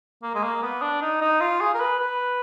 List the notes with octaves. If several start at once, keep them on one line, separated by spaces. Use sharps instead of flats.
A#3
G#3
A#3
B3
D4
D#4
D#4
F4
G#4
A#4
B4
B4